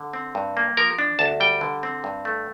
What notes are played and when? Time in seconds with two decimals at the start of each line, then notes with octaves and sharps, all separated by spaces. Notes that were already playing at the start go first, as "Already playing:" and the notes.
Already playing: D3
0.13 C4
0.35 G2
0.57 A#3
0.77 F3 A#4
0.99 D4
1.19 D2 A5
1.40 G3 G5
1.61 D3
1.83 C4
2.04 G2
2.25 A3